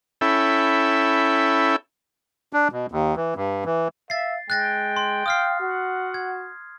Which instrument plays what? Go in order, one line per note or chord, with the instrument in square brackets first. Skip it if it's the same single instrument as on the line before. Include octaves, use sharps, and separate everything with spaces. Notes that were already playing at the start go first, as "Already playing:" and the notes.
[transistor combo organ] C#4 E4 A4 E5 G5 B5
[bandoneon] D4
B2
D#2
E3
G2
E3
[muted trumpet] E5 [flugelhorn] F5 [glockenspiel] A6 C7
[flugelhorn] G#3 [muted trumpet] G5 [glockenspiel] F#6 A6 A#6
[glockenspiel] C6
[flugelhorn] F5 [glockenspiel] D#6 F6 C7
[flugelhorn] F#4 [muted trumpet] F#5
[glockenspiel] G#6